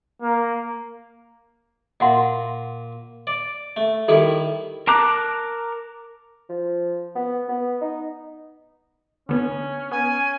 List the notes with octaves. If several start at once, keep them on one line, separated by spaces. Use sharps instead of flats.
A#3
A#2 E5 F#5 C6
D5
A3
D#3 G3 E4 A4
A#4 A5 A#5 D6 F#6
F3
B3
B3
D#4
D3 B3 C#4 D4
B3 C#4 G#5